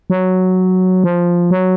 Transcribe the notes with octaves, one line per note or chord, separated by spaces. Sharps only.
F#3
F3
F#3